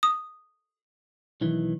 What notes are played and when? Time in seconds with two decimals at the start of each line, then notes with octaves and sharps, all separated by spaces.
0.03 D#6
1.41 B1 D#3 E3